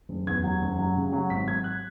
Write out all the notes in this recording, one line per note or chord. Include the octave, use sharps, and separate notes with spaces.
F#1
E2 G#6
F#3
F#1
F#3
C#3
F#3
G#1 B6
F#3 G#6
F#6